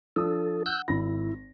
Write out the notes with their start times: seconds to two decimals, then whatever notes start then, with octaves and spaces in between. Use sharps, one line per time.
0.16 F3 D4 A4 D#6
0.66 F#5 E6 F#6 G6
0.88 G#1 E4 A#6